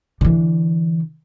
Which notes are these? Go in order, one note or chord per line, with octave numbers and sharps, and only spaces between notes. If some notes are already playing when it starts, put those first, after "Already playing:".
D3 E3